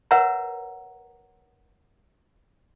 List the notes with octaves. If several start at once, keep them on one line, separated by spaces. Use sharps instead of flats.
A#4 B4 C#5 E5 F#5 A#5